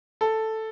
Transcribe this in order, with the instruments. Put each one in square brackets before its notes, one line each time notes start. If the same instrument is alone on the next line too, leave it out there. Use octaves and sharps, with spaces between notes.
[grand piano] A4